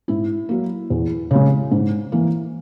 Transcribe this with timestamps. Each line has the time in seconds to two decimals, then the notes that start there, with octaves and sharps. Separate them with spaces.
0.08 G#2 E4
0.49 F#3 A#3
0.90 E2
1.31 C#3 G#3
1.72 G#2
2.12 E3 A#3